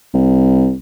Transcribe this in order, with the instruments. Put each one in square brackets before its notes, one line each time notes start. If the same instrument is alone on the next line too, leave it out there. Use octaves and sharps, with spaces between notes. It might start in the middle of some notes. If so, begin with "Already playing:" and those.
[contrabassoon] C2